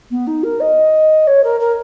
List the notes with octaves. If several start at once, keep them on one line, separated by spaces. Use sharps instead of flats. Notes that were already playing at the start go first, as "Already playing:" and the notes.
B3
D#4
A#4
D#5
C#5
A#4
A#4